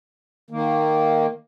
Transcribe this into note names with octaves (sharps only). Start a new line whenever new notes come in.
D#3 A#3